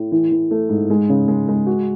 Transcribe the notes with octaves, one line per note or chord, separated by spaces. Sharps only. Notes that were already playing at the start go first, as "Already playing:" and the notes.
Already playing: A2
E3
E3
A3
G#2
G#3
C#3
G#3
G#3
F#4